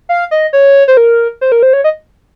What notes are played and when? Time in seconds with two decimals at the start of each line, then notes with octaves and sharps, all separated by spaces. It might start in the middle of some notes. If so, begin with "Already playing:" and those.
0.09 F5
0.31 D#5
0.53 C#5
0.88 C5
0.97 A#4
1.41 C5
1.52 A#4
1.63 C5
1.73 C#5
1.84 D#5